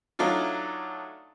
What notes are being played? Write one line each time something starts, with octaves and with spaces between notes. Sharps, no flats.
F#3 A3 D4 D#4 F4